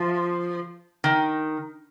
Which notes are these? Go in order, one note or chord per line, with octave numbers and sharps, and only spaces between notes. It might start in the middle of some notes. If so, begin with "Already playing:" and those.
Already playing: F3
D#3